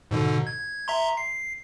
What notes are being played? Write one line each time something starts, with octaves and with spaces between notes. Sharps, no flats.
G#2 B2 D3
G#6
E5 A#5 C6
C7